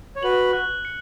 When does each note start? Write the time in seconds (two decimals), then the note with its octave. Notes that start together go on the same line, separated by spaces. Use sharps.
0.16 C#5
0.23 F#4 B4 F#7
0.53 F#6
0.85 C#7